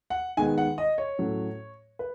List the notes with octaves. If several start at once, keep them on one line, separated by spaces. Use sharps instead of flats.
F#5
D#3 G#3 B3 G#5
F#5
D#5
C#5
A2 F#3 A3 C#4
B4